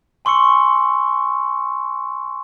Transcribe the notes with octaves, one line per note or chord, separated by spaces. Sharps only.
G#5 C6 C#6 E6 C#7